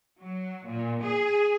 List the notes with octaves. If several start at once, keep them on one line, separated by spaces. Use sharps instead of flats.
F#3
A#2
G#4